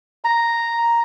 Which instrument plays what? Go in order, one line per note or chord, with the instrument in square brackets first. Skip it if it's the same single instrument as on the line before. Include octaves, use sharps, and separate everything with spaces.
[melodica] A#5